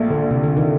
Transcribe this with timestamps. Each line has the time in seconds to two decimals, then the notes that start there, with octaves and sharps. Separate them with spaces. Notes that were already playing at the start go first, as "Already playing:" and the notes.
Already playing: A#1 A#2 A3
0.10 D3
0.30 C3
0.43 D3
0.57 D#3